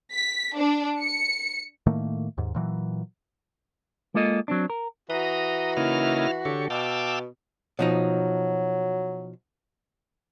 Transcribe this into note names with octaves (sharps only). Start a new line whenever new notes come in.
B6
D4
C#7
A2 D#3 A3 A#3
D#2 G#2
A#2 E3 F#3
G#3 A#3 F4 A4 D#5
F#3 C4 D4
A#4
E3 F#4 A#5 D#6
C#3 A#3 D#4 E4 F6
D3 G4 A4 C#5
B2 F5 G5 A5 D6 E6
B2 F3 F#3 D#4